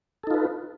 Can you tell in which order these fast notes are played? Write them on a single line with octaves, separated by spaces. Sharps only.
A4 D#4 F4 B4